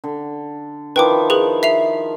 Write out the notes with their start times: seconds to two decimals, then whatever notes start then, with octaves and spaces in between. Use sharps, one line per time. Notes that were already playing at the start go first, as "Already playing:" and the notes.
0.04 D3
0.96 D#3 F3 E4 B4 G5 D6
1.30 G#4 B4 F#7
1.63 E5 C7 F7